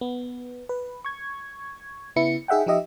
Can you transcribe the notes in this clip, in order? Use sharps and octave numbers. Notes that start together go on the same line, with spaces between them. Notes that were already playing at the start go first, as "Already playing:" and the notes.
B3
B4
C#6 G#6
C#3 B3 E4 C#7
D#4 G#4 E5 F#5 G5
F3 D#4 G4 D#5 E5